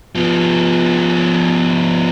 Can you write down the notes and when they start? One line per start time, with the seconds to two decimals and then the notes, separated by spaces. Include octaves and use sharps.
0.15 F3 B3